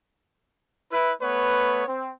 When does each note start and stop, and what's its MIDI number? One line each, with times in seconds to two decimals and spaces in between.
0.92 1.12 64
0.92 1.12 71
1.21 1.87 57
1.21 1.87 59
1.21 1.87 71
1.21 1.87 73
1.87 2.10 60